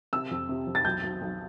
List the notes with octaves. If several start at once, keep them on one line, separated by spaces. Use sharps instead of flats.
C3 E6
F2
C3
F2
A6
B1 G6
B1
B1